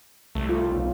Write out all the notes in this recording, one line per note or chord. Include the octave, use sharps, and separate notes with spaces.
C2 A3
F4
B1